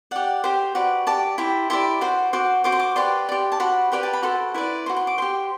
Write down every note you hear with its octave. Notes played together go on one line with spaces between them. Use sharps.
G4 D5 F#5
G4 C5 G5
F#4 B4 D5
G4 D5 A5
E4 G4 C5
E4 G4 D5 C6
F#4 C5
F#4 C5 D6
F#4 C5 D6
C6
D6
G4 B4 D5 C6
G4 D5
A5
F#4 C5 B5
G4 B4 D5 G5
A5
B5
F#4 A4 C5 C6
E4 B4 D5
F#4 C5 C6
C6
D6
G4 C5 C6